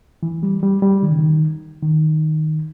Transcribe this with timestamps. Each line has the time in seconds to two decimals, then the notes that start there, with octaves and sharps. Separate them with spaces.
0.23 E3
0.43 G3
0.63 G3
0.82 G3
1.03 D#3
1.11 C#3
1.19 D#3
1.83 D#3